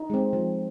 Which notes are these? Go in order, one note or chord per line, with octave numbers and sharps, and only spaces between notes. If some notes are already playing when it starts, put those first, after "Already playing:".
Already playing: D#4
G#3 C4
F3